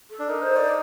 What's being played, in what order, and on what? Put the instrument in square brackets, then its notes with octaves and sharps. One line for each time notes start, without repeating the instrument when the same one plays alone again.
[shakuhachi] A4
[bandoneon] D4
[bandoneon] D#4 [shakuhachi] A#4
[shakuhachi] C5
D5